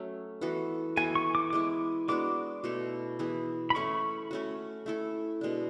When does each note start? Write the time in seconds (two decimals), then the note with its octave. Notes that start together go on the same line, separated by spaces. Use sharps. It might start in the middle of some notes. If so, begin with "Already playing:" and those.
Already playing: F#3 A3 C#4
0.41 E3 B3 F#4 A4
0.97 E3 B3 F#4 A4 G#5
1.15 C#6
1.35 D6
1.50 G#3 B3 E4 D6
2.08 G#3 B3 D4 F#4 D6
2.64 B2 A3 E4 A4
3.19 E3 B3 E4 G#4
3.70 B5
3.75 A3 C#4 E4 A4 C#6
4.31 A3 C#4 F#4
4.86 A3 E4 A4
5.41 B2 G#3 D4